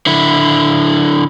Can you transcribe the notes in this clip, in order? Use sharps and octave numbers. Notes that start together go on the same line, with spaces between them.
D3 E4